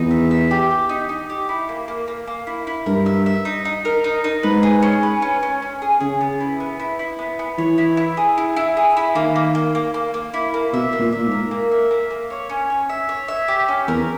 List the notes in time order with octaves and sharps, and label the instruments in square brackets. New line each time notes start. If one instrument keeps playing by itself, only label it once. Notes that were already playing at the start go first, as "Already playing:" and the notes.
Already playing: [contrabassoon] E2 [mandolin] D#4
[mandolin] E5
E5
G4
G4
D#4
D#4
G4
E4
A#3
A#3
A#3
A#3
E4
E4
[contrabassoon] G2 [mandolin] A#4
[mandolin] E5
E5
D#4
D#4
A#4
D#4
D#4
[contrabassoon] G#2 [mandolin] B4
[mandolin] G#4
C#4
B4
C#4
C#4
C#4
G#4
[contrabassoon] C#3 [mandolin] G#4
[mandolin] B3
E4
B3
E4
E4
B3
B3
[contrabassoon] E3 [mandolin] C#5
[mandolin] E4
E4
G#4
E4
E4
G#4
E4
[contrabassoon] D#3 [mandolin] A#3
[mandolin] A#3
A#3
A#3
A#3
A#3
E4
A#3
[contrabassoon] B2 [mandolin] E5
[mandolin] A#3
[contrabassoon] A#2
[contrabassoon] A#2 [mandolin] E5
[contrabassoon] G#2
[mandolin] A#4
A#3
E5
A#3
A#3
C#5
C#4
C#5
E5
C#5
E5
G4
C#4
[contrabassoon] E2 [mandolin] A#4